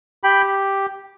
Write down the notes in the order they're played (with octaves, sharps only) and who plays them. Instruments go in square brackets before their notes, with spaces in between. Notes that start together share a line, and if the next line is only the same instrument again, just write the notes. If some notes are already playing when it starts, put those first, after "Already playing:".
[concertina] G4 G5 B5